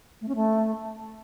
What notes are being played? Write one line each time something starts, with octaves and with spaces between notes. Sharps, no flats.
A3
C#4
A3